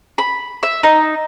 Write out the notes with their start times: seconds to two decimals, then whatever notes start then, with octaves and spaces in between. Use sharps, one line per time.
0.18 B5
0.63 E5
0.83 D#4